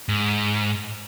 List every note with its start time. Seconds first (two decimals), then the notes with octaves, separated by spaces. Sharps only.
0.09 G#2